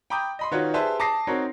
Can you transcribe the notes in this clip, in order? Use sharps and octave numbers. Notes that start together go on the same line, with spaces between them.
G5 A#5 B5 D6 D#6 G6
D#5 B5 C6
D#3 D#4 F4 F#4 B4 C#5
G4 G#4 B4 C5 E5 A5
A5 D6 D#6 A#6 C7
C4 D#4 F#4 A#4 C#5